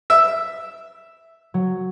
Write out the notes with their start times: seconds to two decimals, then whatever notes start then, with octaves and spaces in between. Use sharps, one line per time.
0.10 E5
1.54 F#3